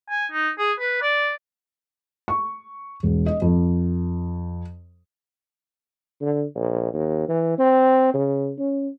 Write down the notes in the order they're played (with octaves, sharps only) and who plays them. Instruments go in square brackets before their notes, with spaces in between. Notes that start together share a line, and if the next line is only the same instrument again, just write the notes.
[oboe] G#5
D#4
G#4
B4
D5
[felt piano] C#6
E1
D#5
F2
[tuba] D3
A#1
D#2
E3
C4
C#3
C#4